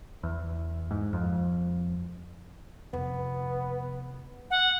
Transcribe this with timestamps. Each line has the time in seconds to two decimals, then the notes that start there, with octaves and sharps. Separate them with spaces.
0.23 E2
0.91 G#2
1.13 F2
2.93 F1 B3
4.51 F#5